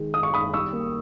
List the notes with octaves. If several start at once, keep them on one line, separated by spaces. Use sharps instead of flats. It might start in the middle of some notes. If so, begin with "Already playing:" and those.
Already playing: D#3 G#3
G#3 D#6
C#6
D#3 B5 D#6
G3 C#6 E6
A#3